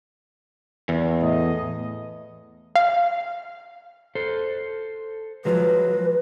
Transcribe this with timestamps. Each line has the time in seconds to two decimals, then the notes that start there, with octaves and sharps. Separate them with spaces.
0.89 E2
1.21 A2 A3 D#5
2.76 F5
4.15 A4 C5
5.45 F3 F#3 G#3 B4